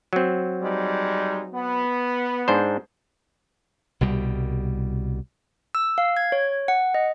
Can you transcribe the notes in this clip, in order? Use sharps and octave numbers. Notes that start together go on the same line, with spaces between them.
F#3 C4
G3 G#3 D#4
B3
G#2 D4 C5
C2 B2 G3
E6
F5
G#6
C#5
F#5
D#5